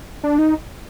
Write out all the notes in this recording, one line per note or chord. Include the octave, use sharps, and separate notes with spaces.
D4
D#4